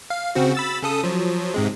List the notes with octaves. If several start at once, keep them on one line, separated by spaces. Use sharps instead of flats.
F5
C#3 C4 F#4
B5 E6 A6
C#3 A4 D#6
F3 F#3
G#2 C3 G#3